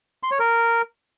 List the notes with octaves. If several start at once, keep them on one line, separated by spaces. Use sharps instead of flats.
C6
C#5
A#4